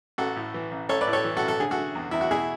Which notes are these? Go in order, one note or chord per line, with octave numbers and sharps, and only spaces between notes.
A1 F#4 A4
A2
E3
A1
A1 A4 C#5
B4 D5
A2
A4 C#5
E3
F#4 A4
A1
A4
D3 G#4
F#4 A4
D3
E2
E2 E4
F#4
B2 E4 G#4